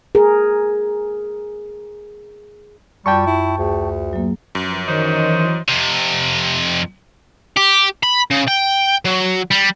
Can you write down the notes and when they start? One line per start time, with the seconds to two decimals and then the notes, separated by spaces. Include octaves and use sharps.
0.15 G#4 A#4
3.06 F#2 G3 F4 G5 A5 C#6
3.26 E4
3.58 D2 G#4
4.13 F#3 A#3
4.55 F#2 F3 B4
4.87 D#3 E3 C5 C#5 D#5
5.69 F2 C3
7.57 G4
8.03 B5
8.31 C#3
8.48 G5
9.05 F#3
9.51 G3